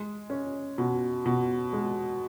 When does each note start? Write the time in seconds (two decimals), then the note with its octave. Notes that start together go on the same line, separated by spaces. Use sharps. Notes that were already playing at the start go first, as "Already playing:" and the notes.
Already playing: G#3
0.30 C#4
0.78 B2
1.26 B2
1.73 G#3